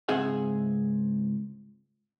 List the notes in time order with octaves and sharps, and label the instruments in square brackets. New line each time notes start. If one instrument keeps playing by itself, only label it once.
[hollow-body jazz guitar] C#2 G#2 C4 G#4 E5 F#5